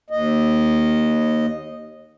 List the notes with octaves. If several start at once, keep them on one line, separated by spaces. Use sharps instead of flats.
D#2 D#5